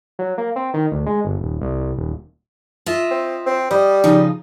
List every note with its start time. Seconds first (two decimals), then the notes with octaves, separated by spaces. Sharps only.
0.19 F#3
0.38 A#3
0.56 C4
0.74 D#3
0.92 D2
1.06 G#3
1.25 G1
1.41 D#1
1.61 C2
1.81 C2
1.98 D#1
2.86 F4 D#5 E5
3.11 C4
3.46 C4
3.71 G3 D#5
4.04 C#3 F3 D#4